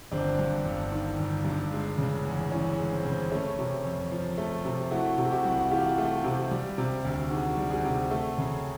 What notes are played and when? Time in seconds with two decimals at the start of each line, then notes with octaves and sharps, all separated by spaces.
0.12 G1 C4 D4
0.39 G2
0.65 G1
0.92 D#3
1.19 G1
1.45 G2
1.72 G#3
1.98 C#3
2.25 E2
2.51 E3 C#4
2.78 G#3
2.92 C4
3.05 C#3 C4
3.32 A3 C#4
3.59 C3
3.85 F2
4.12 F3
4.38 A3
4.65 C3
4.91 A3 E4 F#4
5.18 C3
5.25 G4
5.31 E4 F#4
5.45 C2
5.59 F#4
5.71 E3 F4 G4
5.98 A3
6.24 C3
6.51 G3
6.78 C3
7.05 D2
7.30 D#3 F#4 G#4
7.57 G3
7.70 F#4 G#4
7.85 C3
8.11 A3
8.38 C#3